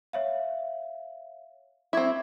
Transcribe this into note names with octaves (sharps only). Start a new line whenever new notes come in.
C#5 E5 F5
C4 E4 C#6 D6 G#6